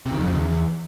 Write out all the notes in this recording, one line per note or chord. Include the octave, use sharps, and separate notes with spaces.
C3
D#3
F2
C#3
E2